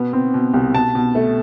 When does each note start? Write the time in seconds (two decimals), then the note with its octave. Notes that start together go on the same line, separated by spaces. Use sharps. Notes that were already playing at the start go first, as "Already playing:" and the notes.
Already playing: B2 B3
0.13 C4
0.34 B2
0.54 C2
0.74 B2 A5
0.95 B2
1.15 A3